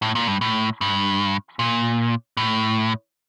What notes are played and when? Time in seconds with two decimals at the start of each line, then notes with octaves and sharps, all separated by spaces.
0.02 A2
0.15 A#2
0.28 G2
0.41 A2
0.81 G2
1.59 A#2
2.37 A2